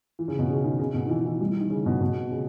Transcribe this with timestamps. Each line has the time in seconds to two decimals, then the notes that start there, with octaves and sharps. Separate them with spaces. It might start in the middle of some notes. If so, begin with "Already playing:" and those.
0.19 E3
0.28 C#3
0.39 B2
0.49 C#3
0.64 D#3
0.79 C#3
0.94 B2
1.05 D#3
1.09 E3
1.25 E3
1.41 G3
1.51 E3
1.61 D#3
1.70 C#3
1.86 B2
2.01 B2
2.31 C#3